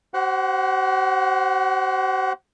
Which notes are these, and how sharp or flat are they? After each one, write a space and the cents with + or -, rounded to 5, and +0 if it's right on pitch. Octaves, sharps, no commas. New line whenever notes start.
F#4 +45 C5 +0 F#5 +0